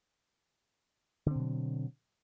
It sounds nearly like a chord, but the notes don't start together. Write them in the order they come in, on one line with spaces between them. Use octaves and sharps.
D3 C4 B2 F#3